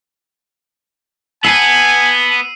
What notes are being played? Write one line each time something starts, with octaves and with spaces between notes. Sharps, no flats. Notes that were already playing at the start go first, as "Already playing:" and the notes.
B3 G#5 A5 E6 C7 D#7